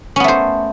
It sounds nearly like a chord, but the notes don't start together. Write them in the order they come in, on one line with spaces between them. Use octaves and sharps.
C#4 B3 A3 C5